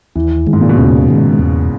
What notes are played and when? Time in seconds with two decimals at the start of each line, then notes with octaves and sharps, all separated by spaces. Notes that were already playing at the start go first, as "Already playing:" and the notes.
0.15 D#2 E3
0.47 D#3 G#3
0.53 G#2
0.61 A#2
0.69 B2
0.78 D#2 C#3
1.08 D#3 G#3
1.39 E2